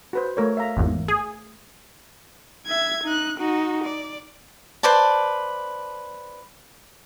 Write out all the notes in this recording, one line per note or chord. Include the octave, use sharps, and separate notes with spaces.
F#4 B4 C5
A3 A#4 C#5
E5 F5 A#5
G#1 E2
G#4
E5 G#6
D#4 F#6
D#4 F#4
D5
B4 C5 D5 A5